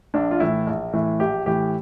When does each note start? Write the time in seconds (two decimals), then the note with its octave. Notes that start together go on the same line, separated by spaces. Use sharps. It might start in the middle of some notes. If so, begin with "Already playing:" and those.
0.14 A#1 D4
0.31 F4
0.40 A2 E3 E4
0.67 A#1
0.93 A2 E3
1.20 A#1 G4
1.46 A2 E3 G4